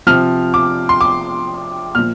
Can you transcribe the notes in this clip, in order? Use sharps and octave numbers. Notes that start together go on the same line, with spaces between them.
C3 F3 F6
D6
C6
D6
A#2 F3 F6